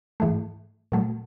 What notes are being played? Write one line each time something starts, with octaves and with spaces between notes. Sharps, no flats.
G#2 E3 A3
A#2 F#3 A3